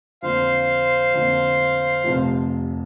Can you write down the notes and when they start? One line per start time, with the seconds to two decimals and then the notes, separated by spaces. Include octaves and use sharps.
0.23 F2 D3 A#3 C5 F5
1.14 F2 D3 A#3
2.04 F1 F2 C3 F3